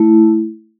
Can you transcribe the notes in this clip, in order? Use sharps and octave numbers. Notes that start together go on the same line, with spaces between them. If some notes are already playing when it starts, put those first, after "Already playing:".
Already playing: A3 E4